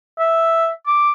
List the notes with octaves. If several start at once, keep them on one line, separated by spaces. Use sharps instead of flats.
E5
D6